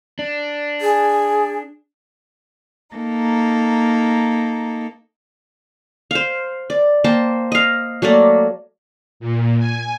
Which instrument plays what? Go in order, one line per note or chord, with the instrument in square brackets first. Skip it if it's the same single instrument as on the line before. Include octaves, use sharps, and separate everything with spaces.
[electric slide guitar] D4
[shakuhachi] G#4
[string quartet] A#3 D#4 A4
[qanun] C5 F5
D5
A#3 C5 G5 A5
D#5 F5
F#3 A3 A#3 D5
[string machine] A#2
G#5